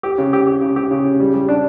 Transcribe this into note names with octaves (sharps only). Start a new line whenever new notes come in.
G4
C#3
G4
G4
C#3
G4
C#3
C#3
G3
G3
D4